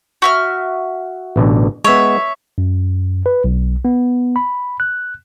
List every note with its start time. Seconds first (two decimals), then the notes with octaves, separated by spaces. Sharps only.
0.22 F#4 E5 F6
1.36 A1 B2 D3
1.84 G#3 B3 C#5 E5
2.58 F#2
3.26 B4
3.44 B1
3.85 B3
4.36 B5
4.80 F#6